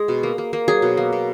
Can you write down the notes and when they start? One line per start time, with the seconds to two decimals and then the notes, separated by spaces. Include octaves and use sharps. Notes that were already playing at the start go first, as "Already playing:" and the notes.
Already playing: G#3 G#4
0.08 B2
0.23 A#3
0.38 A#3
0.53 A#3
0.68 F#3 G#4
0.82 B2
0.97 A#3
1.13 B2